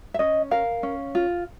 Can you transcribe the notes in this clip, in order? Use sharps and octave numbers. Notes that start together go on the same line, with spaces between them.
E5
C#4 D#5
A#4 F5
C#4
F4